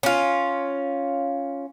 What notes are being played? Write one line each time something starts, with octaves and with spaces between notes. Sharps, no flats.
C#4 F4